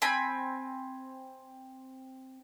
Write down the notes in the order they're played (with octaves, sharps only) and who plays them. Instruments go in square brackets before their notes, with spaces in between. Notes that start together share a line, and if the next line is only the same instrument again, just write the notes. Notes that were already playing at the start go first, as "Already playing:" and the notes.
[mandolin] C4 G#5 B5